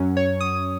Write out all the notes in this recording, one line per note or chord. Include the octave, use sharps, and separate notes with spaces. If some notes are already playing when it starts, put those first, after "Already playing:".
Already playing: F#2 F#3 C#4
C#5
D#6